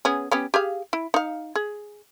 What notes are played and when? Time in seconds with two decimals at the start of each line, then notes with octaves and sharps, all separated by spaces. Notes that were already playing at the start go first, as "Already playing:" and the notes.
0.05 B3 C#4 G#4
0.31 B3 C#4 G4
0.54 G4 G#4 F5
0.93 E4
1.14 D#4 F5
1.56 G#4